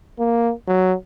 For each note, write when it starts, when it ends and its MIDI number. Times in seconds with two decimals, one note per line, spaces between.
0.19 0.52 58
0.67 0.94 54